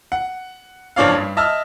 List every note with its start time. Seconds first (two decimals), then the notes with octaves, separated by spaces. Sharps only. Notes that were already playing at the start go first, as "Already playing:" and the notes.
0.12 F#5
0.96 F#1 F3 D4 C#5 D5 F5
1.15 G2
1.37 D#5 E5 A5 E6 F6